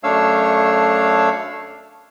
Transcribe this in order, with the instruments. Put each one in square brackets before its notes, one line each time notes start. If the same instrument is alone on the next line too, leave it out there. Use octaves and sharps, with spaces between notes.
[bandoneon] F#2 A3 D4 C#5 F5 E6